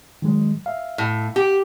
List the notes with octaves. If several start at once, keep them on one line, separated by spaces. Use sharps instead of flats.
D#3 F#3 G#3
E5 F5
A2
G4